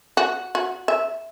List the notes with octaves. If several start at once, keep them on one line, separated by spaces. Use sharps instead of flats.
F#4
F#4
E5